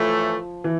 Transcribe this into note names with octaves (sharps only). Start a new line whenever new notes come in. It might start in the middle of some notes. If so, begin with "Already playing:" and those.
Already playing: A2 E3 F3 A3
E3